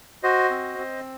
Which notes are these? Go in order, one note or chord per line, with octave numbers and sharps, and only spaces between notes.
F#4 C5 D#5
C4
C4